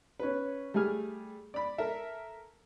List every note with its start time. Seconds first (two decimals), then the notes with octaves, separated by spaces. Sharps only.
0.20 C#4 B4
0.74 G3 A3 G#4 G#5 F6
1.54 D5 B5
1.78 A4 A#4 E5